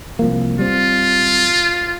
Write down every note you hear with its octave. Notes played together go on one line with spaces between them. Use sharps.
C2 F3 A#3
G3 C4 F4